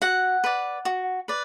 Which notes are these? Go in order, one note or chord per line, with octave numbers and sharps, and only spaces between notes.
F#4 F#5
B4 D5
F#4
B4 D5